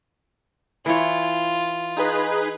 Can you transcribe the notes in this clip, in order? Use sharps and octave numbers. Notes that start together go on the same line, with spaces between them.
E3 E4 F4 C#5
D#4 G#4 B4